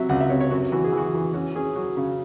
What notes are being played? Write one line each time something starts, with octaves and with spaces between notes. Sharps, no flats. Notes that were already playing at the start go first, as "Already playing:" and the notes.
Already playing: C3 F#3 E5
C#2 F#5
E5
C3 C#5
C#5
F#2 F#4
E3 F#4
G#4
E3
F#4
E3
C#4 F#4
C#4 G#4
F#3 F#4
C#3